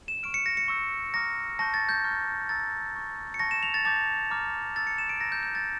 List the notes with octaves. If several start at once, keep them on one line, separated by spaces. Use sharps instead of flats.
E7
C#6 F6 D7
C#7
A#6
C#7
C#6 E6 G6
A#5 D6 F6 A#6
A5 C#6 G6 A#6
A6
G6
A#5 C#6 F6
A#5 C#6 E6 G6 A6
C#6 G6
C#7
A5 C#6 F6 A#6
E7
F7
A6
A5 D6 G6 A6
A#5 D6 F6
A5 E6 G6 A6
C#7
E7
D7
A#5 E6 G6 A#6
G6
G6
A6